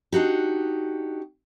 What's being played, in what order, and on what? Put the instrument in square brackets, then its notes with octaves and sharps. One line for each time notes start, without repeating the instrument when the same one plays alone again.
[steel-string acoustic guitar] D4 D#4 F#4 G4